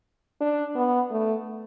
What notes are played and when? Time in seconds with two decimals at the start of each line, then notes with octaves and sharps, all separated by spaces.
0.41 D4
0.76 B3
1.10 A3